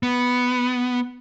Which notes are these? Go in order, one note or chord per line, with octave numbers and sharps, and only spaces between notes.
B3